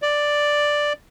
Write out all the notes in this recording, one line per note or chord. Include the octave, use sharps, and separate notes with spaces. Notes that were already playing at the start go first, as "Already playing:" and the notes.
D5